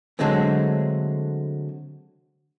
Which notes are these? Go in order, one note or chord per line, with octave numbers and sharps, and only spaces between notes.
D3 F#3 G#3 A3 C4